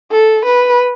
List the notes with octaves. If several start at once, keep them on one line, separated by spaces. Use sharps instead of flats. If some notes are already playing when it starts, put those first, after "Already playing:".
A4
B4